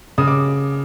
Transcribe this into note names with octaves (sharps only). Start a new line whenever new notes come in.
C#3 D#6
D6